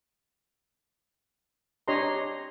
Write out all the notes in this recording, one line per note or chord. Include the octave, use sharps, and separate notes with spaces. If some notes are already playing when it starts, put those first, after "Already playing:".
D4 G4 C#5 D#5 A#5 C6